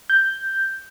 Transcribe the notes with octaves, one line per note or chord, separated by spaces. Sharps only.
G6